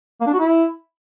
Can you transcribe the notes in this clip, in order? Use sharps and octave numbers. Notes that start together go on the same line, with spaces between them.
A#3
D4
F#4
E4